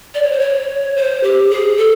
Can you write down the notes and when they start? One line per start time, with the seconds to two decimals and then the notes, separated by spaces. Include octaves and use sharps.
0.15 D5
0.23 C#5
0.31 C5
0.40 C#5
0.96 C5
1.23 G4
1.50 G#4
1.77 A4